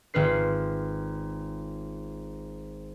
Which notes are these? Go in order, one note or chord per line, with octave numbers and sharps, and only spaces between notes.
G#1 F4 B4 C7